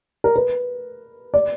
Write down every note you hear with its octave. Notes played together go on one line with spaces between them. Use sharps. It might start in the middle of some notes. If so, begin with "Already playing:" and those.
A#4
B4
D5